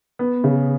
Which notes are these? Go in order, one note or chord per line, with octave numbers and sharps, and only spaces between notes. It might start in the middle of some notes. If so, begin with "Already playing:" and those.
B3
C#3